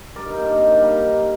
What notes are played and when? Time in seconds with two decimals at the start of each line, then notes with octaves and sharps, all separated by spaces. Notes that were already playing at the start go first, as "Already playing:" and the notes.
0.16 G2 A#4 D5
0.30 D#4
0.37 D#3 A#3
0.45 D4
0.59 C3 D#4
0.74 D4
0.81 G3 A#3
0.88 D#4
1.03 D3